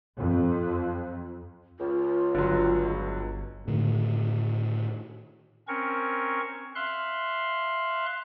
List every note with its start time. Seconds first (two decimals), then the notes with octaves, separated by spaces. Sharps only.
0.18 F2
1.79 C#2 F4
2.35 G1 D3 F#3
3.68 A2 D3 D#3
5.68 C4 C#4 A#4 C#6
6.75 E5 F5 C6 F#6